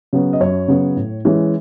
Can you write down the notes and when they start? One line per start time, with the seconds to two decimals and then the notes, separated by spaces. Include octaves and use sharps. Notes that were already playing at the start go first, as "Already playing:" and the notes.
0.13 C#3 F#3 B3
0.33 D#5
0.40 F#2 C#5
0.68 C#3 F#3 B3
0.96 A2
1.25 E3 G#3 C#4